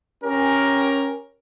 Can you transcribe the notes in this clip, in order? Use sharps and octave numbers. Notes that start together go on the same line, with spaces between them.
C#4 G4 A#4